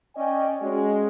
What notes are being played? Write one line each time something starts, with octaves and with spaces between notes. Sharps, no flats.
C#4 D5 D#5 G5 G#5
G#3 C#4 F#4